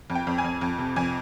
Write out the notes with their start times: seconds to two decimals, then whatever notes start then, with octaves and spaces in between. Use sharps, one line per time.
0.10 F2
0.15 G5
0.27 F2
0.38 G#5
0.44 F2
0.61 F2
0.79 C3
0.96 F2 G#5